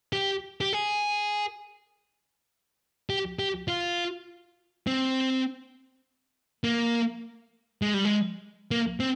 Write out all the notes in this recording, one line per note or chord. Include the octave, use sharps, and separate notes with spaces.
G4
G4
G#4
G4
G4
F4
C4
A#3
G#3
G3
G#3
A#3
C4